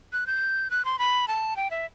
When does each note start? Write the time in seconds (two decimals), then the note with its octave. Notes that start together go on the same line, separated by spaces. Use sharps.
0.13 F#6
0.27 G6
0.71 F#6
0.85 C6
0.99 B5
1.28 A5
1.56 G5
1.71 E5